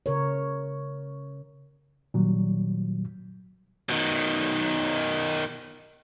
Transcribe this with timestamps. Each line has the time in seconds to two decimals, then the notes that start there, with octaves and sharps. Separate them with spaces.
0.06 C#3 A#4 C#5
2.14 A#2 D#3 F#3 G3
3.89 B2 D#3